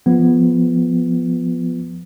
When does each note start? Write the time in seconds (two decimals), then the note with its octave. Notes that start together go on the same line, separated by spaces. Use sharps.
0.06 F3 B3